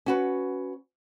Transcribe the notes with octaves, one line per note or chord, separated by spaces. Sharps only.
C#4 F#4 B4